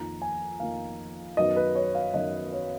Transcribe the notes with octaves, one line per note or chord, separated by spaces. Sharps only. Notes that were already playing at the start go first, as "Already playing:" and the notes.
Already playing: F2 D#3 A#3 D#4 A#5
G#5
F2 D#3 A#3 D#4 F5
F#2 D#3 F#3 B3 D#5
B4
C#5
F5
F#2 D#3 F#3 B3 D#5
C#5